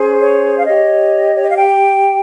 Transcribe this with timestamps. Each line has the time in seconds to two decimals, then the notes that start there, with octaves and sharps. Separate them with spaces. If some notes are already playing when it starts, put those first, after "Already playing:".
Already playing: C#4 G#4 C5
0.20 C#5
0.58 F5
0.66 G4 C#5 D#5
1.35 C#5
1.43 D#5
1.50 F5
1.58 G5